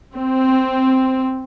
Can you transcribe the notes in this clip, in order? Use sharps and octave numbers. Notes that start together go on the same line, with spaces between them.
C4